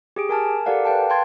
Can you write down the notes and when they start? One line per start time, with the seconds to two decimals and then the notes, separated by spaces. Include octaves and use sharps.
0.16 G4 G#4 D7
0.29 A#4 G#5 A5 F6
0.66 G4 A4 A#4 D5 F5 F#5
0.85 B4 F5 G5 A5
1.10 G5 A5 C6 G#6 A6